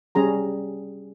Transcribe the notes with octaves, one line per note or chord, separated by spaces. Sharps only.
G3 C#4 G#4 A#5